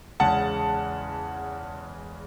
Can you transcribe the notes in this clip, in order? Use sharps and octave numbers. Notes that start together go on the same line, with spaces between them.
E2 C#3 G#3 F#5 A5